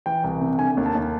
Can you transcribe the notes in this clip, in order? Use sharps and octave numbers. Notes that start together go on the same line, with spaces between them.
E3 G5
C2
C3
D3 G#5
D#2
A5
D#2